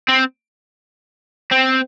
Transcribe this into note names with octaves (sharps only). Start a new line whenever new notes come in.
C4
C4